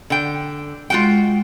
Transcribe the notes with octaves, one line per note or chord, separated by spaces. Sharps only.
D3 G5
G#3 F4 F#4 G5